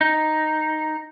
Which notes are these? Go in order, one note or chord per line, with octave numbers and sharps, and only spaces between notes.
D#4